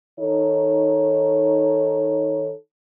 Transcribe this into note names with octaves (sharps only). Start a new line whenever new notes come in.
D#3 D#4 A4 C#5